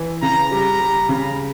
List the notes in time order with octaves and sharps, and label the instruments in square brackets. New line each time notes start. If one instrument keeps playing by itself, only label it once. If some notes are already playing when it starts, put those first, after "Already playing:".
Already playing: [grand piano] E3
[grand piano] C#3 [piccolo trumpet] A#5
[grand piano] G3 [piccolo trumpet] A#5
[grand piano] G3
C#3